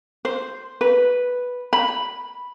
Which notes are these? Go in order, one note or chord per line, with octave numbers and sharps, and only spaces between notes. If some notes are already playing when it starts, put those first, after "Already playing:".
C5
B4
B5